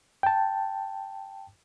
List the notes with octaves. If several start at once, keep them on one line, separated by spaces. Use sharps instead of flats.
G5 A5